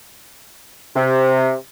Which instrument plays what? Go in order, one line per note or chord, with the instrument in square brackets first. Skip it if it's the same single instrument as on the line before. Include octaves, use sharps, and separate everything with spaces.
[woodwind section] C3